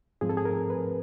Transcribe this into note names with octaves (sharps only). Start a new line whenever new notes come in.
G#2 F3 G#3 C4 G#4
A4
G#4
A#4
B4